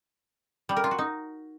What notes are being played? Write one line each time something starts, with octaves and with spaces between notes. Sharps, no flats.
G3
A#4
F4
F#4
D#4